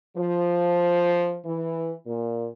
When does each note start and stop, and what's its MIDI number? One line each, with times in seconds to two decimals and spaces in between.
0.17 1.38 53
1.45 1.93 52
2.06 2.47 46